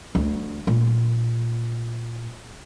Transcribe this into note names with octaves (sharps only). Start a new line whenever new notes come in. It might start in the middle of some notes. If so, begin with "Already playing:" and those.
D2
A#2